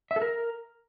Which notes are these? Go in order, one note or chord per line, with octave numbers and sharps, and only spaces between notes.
E5
A4
A#4